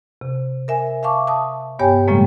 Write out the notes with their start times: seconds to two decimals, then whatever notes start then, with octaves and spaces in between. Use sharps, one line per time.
0.21 C3
0.68 A#4 E5 G#5
1.03 E5 F5 A5 C#6 D6
1.27 A5 D#6
1.79 G2 B3 G4 C#5 G5 G#5
2.08 A2 C#3 F3 G3 G#3 A#3